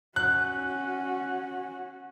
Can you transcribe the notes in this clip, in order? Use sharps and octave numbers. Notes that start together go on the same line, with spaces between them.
C#4 F#4 F#6